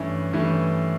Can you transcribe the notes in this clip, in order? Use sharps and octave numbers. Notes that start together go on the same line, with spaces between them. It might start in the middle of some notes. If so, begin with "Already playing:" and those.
Already playing: G2 E3 A3 C#4
G2 E3 A3 C#4